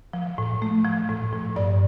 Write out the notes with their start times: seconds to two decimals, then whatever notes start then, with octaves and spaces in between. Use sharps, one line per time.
0.13 F3
0.38 A2
0.62 A3
0.85 F3
1.09 A2
1.33 A2
1.56 G2 D5